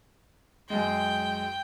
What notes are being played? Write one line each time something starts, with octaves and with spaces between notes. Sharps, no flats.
F#2 G#3 G5